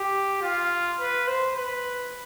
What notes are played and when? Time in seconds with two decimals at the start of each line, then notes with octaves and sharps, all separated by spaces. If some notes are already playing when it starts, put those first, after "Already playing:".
Already playing: G4
0.42 F4
1.00 B4
1.27 C5
1.57 B4